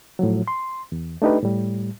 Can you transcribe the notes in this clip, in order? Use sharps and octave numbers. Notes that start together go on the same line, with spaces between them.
A2 F3 F#3
C6
E2
A3 D4 D#4 G4 B4
A2 G3